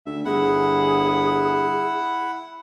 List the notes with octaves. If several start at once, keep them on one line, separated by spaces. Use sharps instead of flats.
D2 E5
G1 E4 G#4 F#5